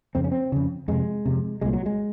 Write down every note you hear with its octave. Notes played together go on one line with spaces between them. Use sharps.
F2 C#3 C4
C#4
C4
F2 C#3
F2 C3 G#3
F2 C3
C2 A#2 G#3
F#3
G#3